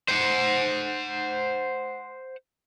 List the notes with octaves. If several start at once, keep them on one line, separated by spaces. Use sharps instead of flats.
C5 F#5